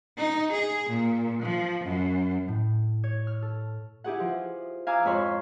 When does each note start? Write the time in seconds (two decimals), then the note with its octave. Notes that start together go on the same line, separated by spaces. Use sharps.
0.18 D#4
0.52 G#4
0.89 A#2
1.42 F3
1.85 F#2
2.48 A2
3.04 C#5
3.27 F6
3.42 A4
4.04 E4 G4 G#4 F#5
4.20 F3
4.87 F5 G#5 A#5 D6 E6 F6
5.05 F2 G#2 C#5 B5 C6